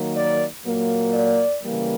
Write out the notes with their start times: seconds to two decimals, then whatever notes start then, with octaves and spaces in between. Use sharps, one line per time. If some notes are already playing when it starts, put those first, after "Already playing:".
Already playing: D#3 F#3 A#3
0.15 D5
0.64 A#2 F#3 A#3
1.14 D5
1.63 C#3 E3 G3 A#3